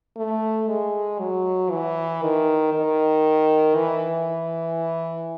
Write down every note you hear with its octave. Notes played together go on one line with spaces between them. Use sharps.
A3
G#3
F#3
E3
D#3
D#3
E3